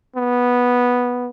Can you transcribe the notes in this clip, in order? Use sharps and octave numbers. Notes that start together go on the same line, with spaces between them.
B3